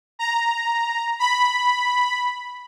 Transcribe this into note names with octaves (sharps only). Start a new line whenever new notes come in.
A#5
B5